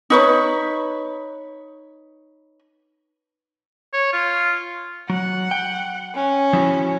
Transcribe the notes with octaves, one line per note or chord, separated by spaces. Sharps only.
D#4 B4 C#5
C#5
F4
F#3 F#5
G5
C#4
F3 E4 F#4